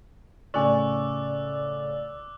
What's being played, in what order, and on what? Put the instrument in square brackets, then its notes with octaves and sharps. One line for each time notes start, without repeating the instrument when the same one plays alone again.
[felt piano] A2 C#3 [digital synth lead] D5 [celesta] G#5 C#6 [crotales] D6 E6 F#6